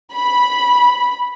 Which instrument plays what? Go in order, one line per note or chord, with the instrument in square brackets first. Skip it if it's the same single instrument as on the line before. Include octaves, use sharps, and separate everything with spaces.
[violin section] B5